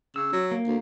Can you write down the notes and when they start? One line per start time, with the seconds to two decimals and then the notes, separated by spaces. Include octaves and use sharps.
0.16 C#3 E6
0.33 F#3
0.51 A#3
0.67 D2